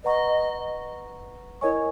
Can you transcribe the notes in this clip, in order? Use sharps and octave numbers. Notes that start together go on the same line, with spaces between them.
B4 D#5 F#5 A#5 C#6
E4 A#4 C#5 D#5 G#5 C#6